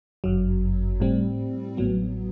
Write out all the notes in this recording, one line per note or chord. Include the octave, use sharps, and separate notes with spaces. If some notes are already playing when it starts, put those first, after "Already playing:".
G1 F#2 F#3
A2 G3 C4
A1 A2 F#3 B3